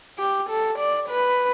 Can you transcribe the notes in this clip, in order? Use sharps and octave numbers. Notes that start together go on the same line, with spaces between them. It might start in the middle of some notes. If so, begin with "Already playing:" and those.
G4
A4
D5
B4